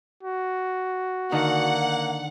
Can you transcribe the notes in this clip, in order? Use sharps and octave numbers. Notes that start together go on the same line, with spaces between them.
F#4
D3 D#3 A#3 D#4 F#5